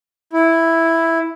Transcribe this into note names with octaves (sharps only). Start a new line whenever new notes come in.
E4